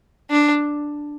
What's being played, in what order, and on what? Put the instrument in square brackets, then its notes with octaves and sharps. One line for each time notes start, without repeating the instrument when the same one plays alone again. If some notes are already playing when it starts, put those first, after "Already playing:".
[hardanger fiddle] D4